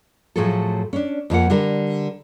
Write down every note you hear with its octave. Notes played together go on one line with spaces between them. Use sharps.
A2 F3 F#3 A3 G#4 A4
C#4 D4
F2 F3 A#3 F#5
D3 G3 A#4